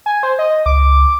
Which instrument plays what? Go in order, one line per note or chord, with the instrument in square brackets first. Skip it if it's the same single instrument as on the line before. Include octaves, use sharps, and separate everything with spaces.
[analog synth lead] G#5
C5
D#5
[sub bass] C#2 [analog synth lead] D6